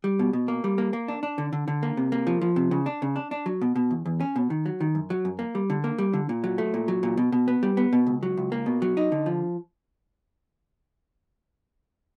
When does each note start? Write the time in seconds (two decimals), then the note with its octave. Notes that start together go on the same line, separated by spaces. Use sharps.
0.04 G3
0.19 B2
0.33 B2
0.48 A#3
0.64 G3
0.78 A#3
0.93 A#3
1.08 D4
1.23 D4
1.38 D3
1.53 D3
1.68 D3
1.83 A#3
1.97 C3
2.12 A#3
2.27 F3
2.42 F3
2.56 C3
2.71 C#3
2.86 D4
3.02 C#3
3.16 D4
3.31 D4
3.46 F#3
3.61 B2
3.76 B2
3.91 E2
4.06 E2
4.20 C#4
4.36 B2
4.50 D#3
4.66 F#3
4.80 D#3
4.95 F#2
5.10 F#3
5.25 F#2
5.39 A#3
5.55 G3
5.70 D3
5.84 A#3
5.98 G3
6.13 D3
6.29 A#2
6.44 F#3
6.58 A3
6.74 A#2
6.88 F#3
7.03 A#2
7.17 B2
7.32 B2
7.48 B3
7.63 G3
7.77 B3
7.93 B2
8.06 C#2
8.23 F#3
8.37 C#2
8.52 A#3
8.66 B2
8.82 F#3
8.97 D#4
9.12 D3
9.26 F3